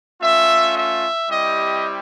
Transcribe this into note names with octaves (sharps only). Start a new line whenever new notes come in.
A3 C#4 F4 E5
E5
G3 C4 E4 G4 D#5